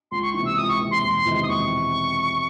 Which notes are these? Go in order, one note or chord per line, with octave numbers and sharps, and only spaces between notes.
C#2 C6
C#6
C3 E3 C#6
E6
C#2 D#6
C#6
C3 E3
C6
E1 C6
E2 C3 D#3 G#3
D#6
E1 C#6